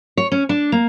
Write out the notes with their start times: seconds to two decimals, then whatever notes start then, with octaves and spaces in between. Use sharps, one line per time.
0.17 C#5
0.32 C#4
0.49 D4
0.72 A#3